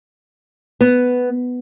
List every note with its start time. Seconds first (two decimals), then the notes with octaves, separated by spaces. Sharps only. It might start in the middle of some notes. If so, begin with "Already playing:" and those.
0.81 B3